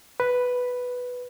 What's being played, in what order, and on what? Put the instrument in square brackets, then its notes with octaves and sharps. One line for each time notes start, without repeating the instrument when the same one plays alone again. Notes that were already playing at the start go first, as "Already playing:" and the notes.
[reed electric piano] B4